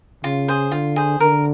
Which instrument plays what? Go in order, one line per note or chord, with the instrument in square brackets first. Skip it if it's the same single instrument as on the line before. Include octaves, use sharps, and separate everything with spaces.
[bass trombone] C#3 [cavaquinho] F4
[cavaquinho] G#4 C5
[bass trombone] D3 [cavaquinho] F4
[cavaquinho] G#4 C5
[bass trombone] D3 [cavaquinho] A#4